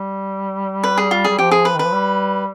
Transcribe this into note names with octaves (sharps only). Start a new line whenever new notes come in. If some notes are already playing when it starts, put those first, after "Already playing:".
Already playing: G3
B4
G#4
F4
G3 G#4
F3 G4
G#4
B4
D#3
B4
F3
G3